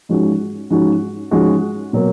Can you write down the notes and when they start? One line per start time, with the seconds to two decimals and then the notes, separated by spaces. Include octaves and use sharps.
0.09 G#2 F3 G#3 C#4 F#4
0.70 G#2 F3 G#3 C#4 F#4
1.31 G#2 F3 G#3 C#4 F#4
1.93 B2 F#3 A#3